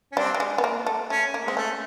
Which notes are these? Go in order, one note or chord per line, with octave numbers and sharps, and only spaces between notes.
C#4
G3 C4 D4
G3
G#3
B3
A#3
A3
A3 C#4
A#3
G#3 C4
A3 C#4